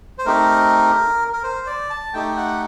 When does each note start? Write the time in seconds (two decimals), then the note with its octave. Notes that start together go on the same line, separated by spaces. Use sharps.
0.18 C5
0.26 A3 C4 D#4 G4 A#4
1.33 A#4
1.43 C5
1.67 D5
1.90 A5
2.13 A3 D#4 G4 G5
2.37 F#5